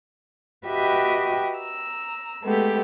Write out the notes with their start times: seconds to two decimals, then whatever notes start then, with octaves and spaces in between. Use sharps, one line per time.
0.67 F#4 G4 B4 D#5 E5 G5
1.59 A#5 E6
2.44 G#3 A3 B3 G4